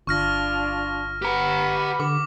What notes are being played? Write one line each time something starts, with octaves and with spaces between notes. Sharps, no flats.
G1 D4 F4 C#6 F6 A#6
G4 B4 F#5 A#5 B5
D3 D6